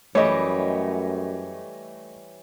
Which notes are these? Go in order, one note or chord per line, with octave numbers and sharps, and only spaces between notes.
F#2 E3 G3 A3 C#5 D#5